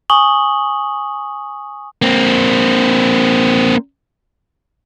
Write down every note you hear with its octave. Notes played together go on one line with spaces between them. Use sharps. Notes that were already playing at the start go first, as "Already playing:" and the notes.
G#5 C#6 D#6 F#7 G7
A#3 C4